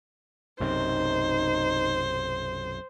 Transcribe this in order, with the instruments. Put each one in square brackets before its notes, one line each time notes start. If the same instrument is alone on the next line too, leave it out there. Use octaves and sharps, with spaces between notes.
[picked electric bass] B1 F#2 C3 [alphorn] D#4 [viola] C5